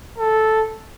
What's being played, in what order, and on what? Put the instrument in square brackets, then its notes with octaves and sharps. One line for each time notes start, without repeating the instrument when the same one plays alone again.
[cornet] A4